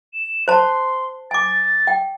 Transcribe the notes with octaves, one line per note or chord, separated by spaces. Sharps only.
E7
C5 A5 C6
G#5 D6 A6
G5